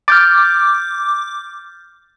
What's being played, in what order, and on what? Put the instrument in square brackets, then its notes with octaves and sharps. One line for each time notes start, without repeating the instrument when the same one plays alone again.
[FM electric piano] D6 [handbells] F6 G6 A6